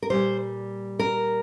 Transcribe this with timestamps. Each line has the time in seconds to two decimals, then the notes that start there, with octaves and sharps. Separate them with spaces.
0.02 A#4
0.10 A#2 G3 C5
0.99 A#4